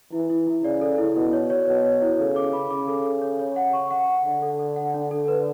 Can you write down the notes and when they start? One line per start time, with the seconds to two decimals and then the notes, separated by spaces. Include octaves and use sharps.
0.12 E3 E4
0.30 E4
0.47 E4
0.64 C#3 D5
0.81 A4
0.98 E4
1.15 B2 E4
1.33 C#5
1.50 C#5
1.68 B2 C#5
1.85 C#5
2.02 E4
2.18 C#3 A4
2.36 D6
2.53 B5
2.70 C#3 D6
2.87 A4
3.05 A4
3.22 C#5
3.39 C#5
3.56 F#5
3.73 C#6
3.91 F#5
4.08 F#5
4.25 D3 F#5
4.42 A4
4.59 A4
4.76 F#5
4.94 D4
5.11 A4
5.28 B4